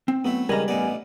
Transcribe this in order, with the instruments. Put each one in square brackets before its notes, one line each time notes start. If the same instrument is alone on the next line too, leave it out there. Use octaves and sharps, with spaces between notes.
[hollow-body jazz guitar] C4
[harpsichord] F#3 A3 E4 [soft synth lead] B3
[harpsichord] C#2 D#3 E3 [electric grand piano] G3 [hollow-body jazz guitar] A#4 A#5 [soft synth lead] G#5
[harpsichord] A1 D#4 D5 [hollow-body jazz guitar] B3